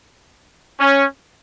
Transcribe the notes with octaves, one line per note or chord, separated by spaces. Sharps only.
C#4